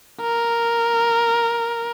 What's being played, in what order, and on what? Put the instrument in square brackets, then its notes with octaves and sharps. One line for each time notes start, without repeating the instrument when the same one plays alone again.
[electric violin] A#4